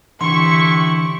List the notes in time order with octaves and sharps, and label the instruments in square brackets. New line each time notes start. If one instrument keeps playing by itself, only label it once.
[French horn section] A2 E4 G4 [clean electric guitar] D3 E3 [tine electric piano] C6 [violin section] C#6